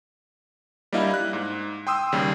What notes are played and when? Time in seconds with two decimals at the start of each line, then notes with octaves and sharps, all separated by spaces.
0.93 G3 A#3 D4 E4 D#5 F5
1.14 F#6
1.33 G#2
1.87 G5 C6 D#6 E6
2.12 D#2 C#3 G3